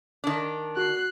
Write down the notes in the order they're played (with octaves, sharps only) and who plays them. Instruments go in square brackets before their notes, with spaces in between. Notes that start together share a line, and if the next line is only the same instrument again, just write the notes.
[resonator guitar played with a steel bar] D#3 D4
[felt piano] F#4 [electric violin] F#6 C7